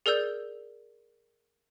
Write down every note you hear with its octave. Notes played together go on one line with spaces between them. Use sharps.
G#4 A#4 D5 E6 G6